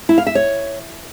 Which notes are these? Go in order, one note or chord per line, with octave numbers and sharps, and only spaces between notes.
E4
F5
E5
C#5